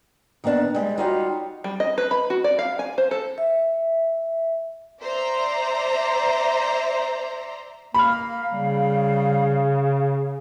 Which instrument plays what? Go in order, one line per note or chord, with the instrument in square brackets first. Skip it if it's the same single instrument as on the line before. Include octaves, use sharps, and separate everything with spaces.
[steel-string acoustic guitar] D#3 A#3 B3 D4 A5
G3 G#3
G3 D#4 F4 F#4 C#5 G5
[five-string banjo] G3
D#5
B4
B5
F#4
D5
F5
G#5
C5
A4
[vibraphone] E5
[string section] C5 D5 E5 A#5
[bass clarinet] A#3 [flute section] F5 [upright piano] B5 F6
[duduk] C#3 [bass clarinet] G3